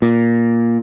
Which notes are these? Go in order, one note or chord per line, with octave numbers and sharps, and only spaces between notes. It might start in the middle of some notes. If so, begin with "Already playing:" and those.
A#2